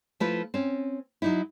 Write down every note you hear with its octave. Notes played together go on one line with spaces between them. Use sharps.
F3 A3 E4 F4 B4
C4 C#4
F#3 D#4 E4